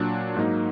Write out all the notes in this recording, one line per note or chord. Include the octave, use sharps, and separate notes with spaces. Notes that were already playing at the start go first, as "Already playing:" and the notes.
Already playing: A#2 F#3 D4
G#2 F#3 A#3 D#4